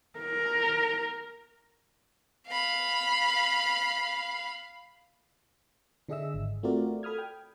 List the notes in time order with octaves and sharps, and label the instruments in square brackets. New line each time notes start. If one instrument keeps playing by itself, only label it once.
[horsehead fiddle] A#4
[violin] F5 B5
[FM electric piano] D3 D4 G#4 D#5 E5 E6
G#1
A3 C4 F4 F#4 A#4 D5
A4 B5 D#6 F6 G#6
G5